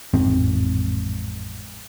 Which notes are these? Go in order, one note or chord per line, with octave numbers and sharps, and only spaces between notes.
A1 F2 G#2 C4